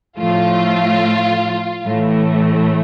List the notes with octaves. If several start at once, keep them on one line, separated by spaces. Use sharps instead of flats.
A2 F3 A3 F4
A2 E3 A3